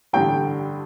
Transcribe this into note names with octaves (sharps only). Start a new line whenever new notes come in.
A1 G2 D3 G5